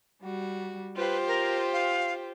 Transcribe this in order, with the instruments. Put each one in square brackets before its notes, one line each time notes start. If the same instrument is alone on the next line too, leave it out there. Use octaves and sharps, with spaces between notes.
[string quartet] G3 F#4
[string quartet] F4 G4 C5 [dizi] B4
[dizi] A#4
F5